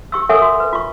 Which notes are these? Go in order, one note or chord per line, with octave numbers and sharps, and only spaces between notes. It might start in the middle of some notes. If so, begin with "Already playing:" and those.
G4 C#6 E6
A4 A#4 C#5 E5 F#5 G#5
F#4
B4
F4 C#6